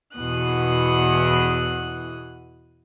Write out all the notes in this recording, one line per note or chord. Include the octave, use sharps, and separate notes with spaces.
E2 B2 E3 D#6 F#6